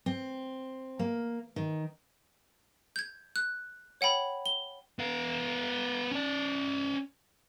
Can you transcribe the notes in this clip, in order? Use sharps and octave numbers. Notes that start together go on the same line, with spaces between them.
C4
A#3
D#3
G6 G#6
F#6
C#5 F#5 G5 B5
G7
B3 F5
C#4 D5